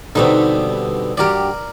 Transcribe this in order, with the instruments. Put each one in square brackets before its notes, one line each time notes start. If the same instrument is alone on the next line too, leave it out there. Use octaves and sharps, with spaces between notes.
[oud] B2 G3 D#4 [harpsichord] D3 B3 C4
[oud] G2 F#4 G4 [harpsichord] A#4 D5